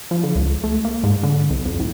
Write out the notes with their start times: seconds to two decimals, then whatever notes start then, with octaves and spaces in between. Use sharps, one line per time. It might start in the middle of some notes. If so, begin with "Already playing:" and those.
0.11 F3
0.23 D3
0.35 C#2
0.64 A3
0.84 A#3
1.03 G#2
1.23 D3
1.50 C2
1.65 F2
1.80 A2